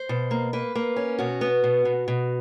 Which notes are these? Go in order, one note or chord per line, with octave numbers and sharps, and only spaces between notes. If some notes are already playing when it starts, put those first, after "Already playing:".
Already playing: C5
B2
A#3
A#3 B4
A#3
C#4
B2 F#4
B3
B2
B2
B2